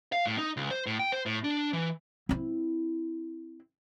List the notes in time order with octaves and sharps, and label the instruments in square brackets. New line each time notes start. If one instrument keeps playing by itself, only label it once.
[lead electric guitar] F5
A2
D#4
C#2
C5
A2
G5
C5
A2
D4
E3
[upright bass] C4 E4